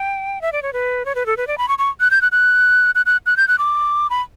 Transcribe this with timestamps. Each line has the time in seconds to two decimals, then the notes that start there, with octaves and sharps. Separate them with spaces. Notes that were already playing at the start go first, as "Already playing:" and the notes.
Already playing: G5
0.42 E5
0.52 D5
0.62 C#5
0.73 B4
1.06 C#5
1.15 B4
1.26 A4
1.37 B4
1.47 D5
1.58 B5
1.68 C#6
1.78 C#6
2.00 F#6
2.11 G6
2.22 F#6
2.32 F#6
2.95 F#6
3.06 F#6
3.26 F#6
3.37 G6
3.48 F#6
3.58 D6
4.10 B5